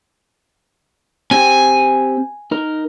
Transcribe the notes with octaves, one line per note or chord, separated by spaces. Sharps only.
C4 G4 G#5
D#4 A#4